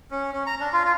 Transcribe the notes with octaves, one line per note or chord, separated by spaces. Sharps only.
C#4
C#4
A#5
D4
F4
F4